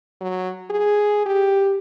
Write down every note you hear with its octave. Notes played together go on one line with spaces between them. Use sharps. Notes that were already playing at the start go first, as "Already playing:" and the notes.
F#3
G#4
G4